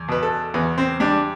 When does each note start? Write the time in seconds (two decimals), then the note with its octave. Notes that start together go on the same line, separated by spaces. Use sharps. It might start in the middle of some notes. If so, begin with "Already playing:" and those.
Already playing: E2
0.08 B2 B4
0.23 A4
0.54 E2 B3
0.78 C4
1.00 G3 D4